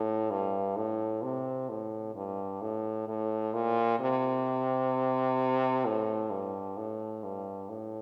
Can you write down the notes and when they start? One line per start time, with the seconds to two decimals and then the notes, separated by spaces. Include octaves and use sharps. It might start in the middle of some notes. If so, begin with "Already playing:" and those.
Already playing: A2
0.30 G2
0.76 A2
1.23 C3
1.70 A2
2.15 G2
2.61 A2
3.08 A2
3.54 A#2
4.00 C3
5.85 A2
6.31 G2
6.77 A2
7.24 G2
7.69 A2